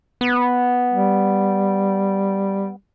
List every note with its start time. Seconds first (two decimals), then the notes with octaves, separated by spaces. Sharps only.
0.21 B3
0.90 G3